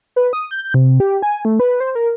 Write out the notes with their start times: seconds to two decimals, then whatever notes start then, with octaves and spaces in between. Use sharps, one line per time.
0.16 B4
0.33 D#6
0.51 G6
0.74 C3
1.00 G4
1.22 G#5
1.45 A3
1.60 B4
1.80 C5
1.95 A#4